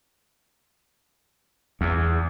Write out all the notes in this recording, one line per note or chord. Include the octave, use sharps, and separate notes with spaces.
E2